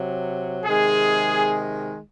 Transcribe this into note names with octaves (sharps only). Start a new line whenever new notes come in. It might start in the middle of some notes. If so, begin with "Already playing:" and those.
Already playing: C3 F#3
C3 D#3 G#3 G#4